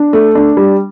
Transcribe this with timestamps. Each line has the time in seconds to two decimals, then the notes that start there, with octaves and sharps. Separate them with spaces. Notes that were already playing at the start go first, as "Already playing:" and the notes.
Already playing: D4
0.13 A3
0.35 D4
0.57 G3